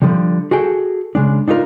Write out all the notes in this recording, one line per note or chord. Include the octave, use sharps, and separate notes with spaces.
D3 F3 G3
F#4 G#4 A4 G5
C#3 G#3 D4
D4 D#4 F4 A#4